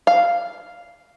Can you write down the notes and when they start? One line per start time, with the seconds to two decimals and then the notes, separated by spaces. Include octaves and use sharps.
0.07 F5